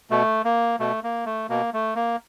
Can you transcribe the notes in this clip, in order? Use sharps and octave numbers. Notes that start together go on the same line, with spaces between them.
B2 A3
A#3
B2 A3
A#3
A3
B2 A#3
A3
A#3